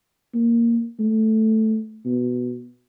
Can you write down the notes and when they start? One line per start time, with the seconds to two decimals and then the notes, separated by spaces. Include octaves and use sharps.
0.34 A#3
1.00 A3
2.06 B2